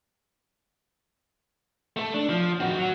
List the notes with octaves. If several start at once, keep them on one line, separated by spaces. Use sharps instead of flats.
A3 A4
D4
F3
C4 F#4
F#3